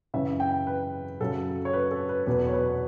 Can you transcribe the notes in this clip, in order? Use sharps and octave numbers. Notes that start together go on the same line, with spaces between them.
F#2 C#3 E3 E5
G5
B4
F#2 C#3 F#3 A4
C#5
B4
A4
B4
E2 B2 F#3 B4
C#5
B4